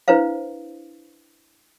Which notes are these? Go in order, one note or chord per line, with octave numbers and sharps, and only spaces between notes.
D4 E4 B4 C5 F5